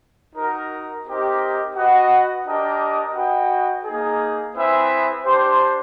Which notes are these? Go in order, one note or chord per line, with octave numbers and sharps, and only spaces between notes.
D#4 F#4 A#4
C4 D#4 G4 A#4
F#4 B4 D#5 F#5
D4 G4 A#4 D#5 G5
F#4 B4 D#5 G5
A#3 D#4 G#4
C4 E4 G#4 B4 E5
D4 G4 C5